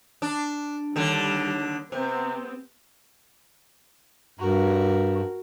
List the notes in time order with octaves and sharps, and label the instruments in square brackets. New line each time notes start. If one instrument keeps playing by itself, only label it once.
[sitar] D4
[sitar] D#2 D3 [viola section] G3
[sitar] C3 [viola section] B3 C4
[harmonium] G2 [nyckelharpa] F#4 A#4